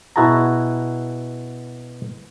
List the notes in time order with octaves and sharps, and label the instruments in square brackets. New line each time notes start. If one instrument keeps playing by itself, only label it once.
[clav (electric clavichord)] B2 E4 F#4 G#4 A5 A#5